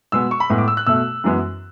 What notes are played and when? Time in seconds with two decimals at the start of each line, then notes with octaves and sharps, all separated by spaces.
0.12 B2 G#3 B3 E6
0.31 C#6
0.40 B5
0.50 A2 G#3 B3
0.58 D6
0.68 E6
0.77 F#6
0.87 B2 A3 E6
1.24 F#2 E3 G#3 B3